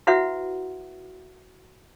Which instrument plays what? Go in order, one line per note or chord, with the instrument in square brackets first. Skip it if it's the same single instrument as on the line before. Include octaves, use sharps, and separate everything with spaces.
[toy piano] E4 F#4 B4 E5 F#5